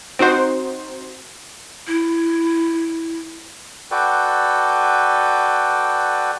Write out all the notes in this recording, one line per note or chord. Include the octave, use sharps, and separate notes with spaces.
C4 D#4 F#4 C5
E4
F#4 A4 B4 D5 G5